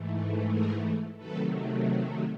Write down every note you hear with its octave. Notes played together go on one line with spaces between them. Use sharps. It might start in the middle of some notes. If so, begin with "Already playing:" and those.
Already playing: G#2 E3 A3
G#4 A#4
C3 D#3 F#3 A3 A4 B4